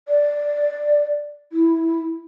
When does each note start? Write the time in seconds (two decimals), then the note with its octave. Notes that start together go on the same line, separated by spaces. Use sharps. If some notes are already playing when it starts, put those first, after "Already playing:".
0.08 D5
1.52 E4